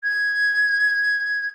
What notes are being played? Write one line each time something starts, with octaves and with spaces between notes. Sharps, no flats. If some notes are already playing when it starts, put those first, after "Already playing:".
G#6